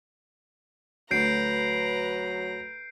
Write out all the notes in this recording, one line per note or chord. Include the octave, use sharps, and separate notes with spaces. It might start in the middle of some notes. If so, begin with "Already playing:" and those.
D2 F#3 B4 C#5 A#5 G6 C7 D7